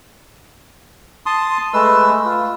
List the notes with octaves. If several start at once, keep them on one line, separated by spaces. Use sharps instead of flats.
A5 C6 D#6
G#3 A3 B4 E6
F4